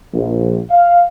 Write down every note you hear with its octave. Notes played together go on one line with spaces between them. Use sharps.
A#1
F5